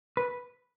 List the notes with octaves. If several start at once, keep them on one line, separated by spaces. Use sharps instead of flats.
B4